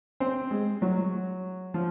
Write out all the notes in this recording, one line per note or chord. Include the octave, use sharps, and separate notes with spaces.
C4
G#3
F#3
F3